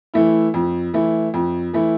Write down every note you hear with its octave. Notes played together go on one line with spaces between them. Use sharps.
E3 A3 E4
F2
E3 A3 E4
F2
E3 A3 E4